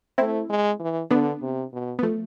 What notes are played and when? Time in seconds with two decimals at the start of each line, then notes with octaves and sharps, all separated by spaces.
0.18 A3 C4 E4
0.50 G#3
0.80 E3
1.10 D3 B3 D4
1.42 C3
1.73 B2
1.99 B3
2.03 F3 A3